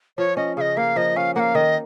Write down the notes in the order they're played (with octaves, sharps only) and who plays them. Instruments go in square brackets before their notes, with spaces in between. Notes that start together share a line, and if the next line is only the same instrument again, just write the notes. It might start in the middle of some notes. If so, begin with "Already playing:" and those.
[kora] F3 [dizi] C#5
[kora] C#4 [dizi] D#5
[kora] C#3 [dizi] D#5 F5
[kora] A#3 [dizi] F5
[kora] F3 [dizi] D#5
[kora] C#4 [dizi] F5
[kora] A#3 [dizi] F5 F#5
[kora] D#3 [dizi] D#5